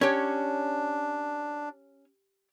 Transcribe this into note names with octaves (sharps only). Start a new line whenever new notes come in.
C#4 D4 G4 C#5